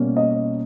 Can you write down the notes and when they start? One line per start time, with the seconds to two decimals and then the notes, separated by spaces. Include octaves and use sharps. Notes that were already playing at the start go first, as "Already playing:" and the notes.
Already playing: B2 G3 A#3 C#4
0.17 D#5